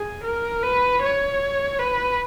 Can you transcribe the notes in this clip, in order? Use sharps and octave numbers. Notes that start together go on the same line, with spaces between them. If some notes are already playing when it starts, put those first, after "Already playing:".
Already playing: G#4
A#4
B4
C#5
B4